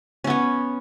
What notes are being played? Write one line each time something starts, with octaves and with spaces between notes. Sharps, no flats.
B3 C#4 C#5